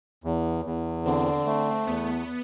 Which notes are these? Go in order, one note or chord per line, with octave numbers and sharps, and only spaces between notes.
E2
E2
D3 C4
A3
E2 B3